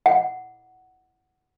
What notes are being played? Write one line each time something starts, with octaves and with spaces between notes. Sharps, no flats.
F#5